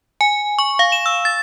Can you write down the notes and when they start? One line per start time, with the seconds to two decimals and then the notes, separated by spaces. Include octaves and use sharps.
0.21 G#5
0.59 C#6
0.79 F5
0.92 E7
1.06 E6
1.25 A6